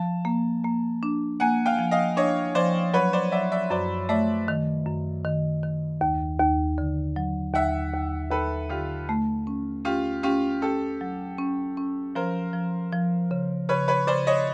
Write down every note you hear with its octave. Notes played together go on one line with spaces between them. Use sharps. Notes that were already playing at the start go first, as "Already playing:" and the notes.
Already playing: F3 A5
A#3
A#3
D4
A#3 F#5 G#5
F5 G5
F3
D#5 F5
D4 C#5 D#5
F3 C5 D5
F#3 B4 C#5
C5 D5
F#3 D5 E5
D5 E5
F#2 C5 D5
A3 D5 E5
D#3
F#2
D#3
D#3
D#2
D#2
D3
F#3
D#2 E5 F#5
D#2
D#2 A4 B4
D3 F4 G4
A3
C#4
C#4 F4 G4
C#4 F4 G4
C#4 G4 A4
F#3
C#4
C#4
F3 A#4 C5
F3
F3
C#3
C#3 B4 C#5
B4 C#5
C#3 C5 D5
C#5 D#5